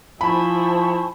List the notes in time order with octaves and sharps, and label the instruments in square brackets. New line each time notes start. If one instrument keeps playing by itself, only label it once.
[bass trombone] F3 [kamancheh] E4 C5 [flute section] G#5 A5 C#6 [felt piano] B5